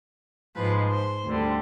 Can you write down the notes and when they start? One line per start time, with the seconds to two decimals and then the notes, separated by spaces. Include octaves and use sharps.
0.56 G#2 F3 G#3 B4
0.91 C5
1.25 D2 D3 G3